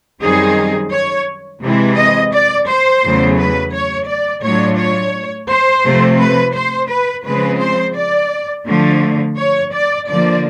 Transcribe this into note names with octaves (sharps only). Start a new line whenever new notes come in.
F#2 D#3 G3 C4 D#4 G#4
C#5
C3 E3 G#3 C4 E4
D#5
D5
C5
E2 C#3 F#3 A3
B4
C#5
D5
A2 F#3 A3 D4 F4 C#5
C#5
C5
C3 F3 A3 C4
B4
C5
B4
C#3 F3 G#3 C4 B4
C5
D5
D3 F3 A3
C#5
D5
D3 F3 A#3 D5